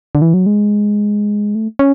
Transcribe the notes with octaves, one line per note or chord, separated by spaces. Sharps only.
D3
E3
F#3
G#3
A3
C#4